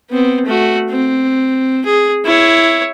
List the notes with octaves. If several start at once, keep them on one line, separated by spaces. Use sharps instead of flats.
B3 C4
A3 F#4
C4
G#4
E4 C#5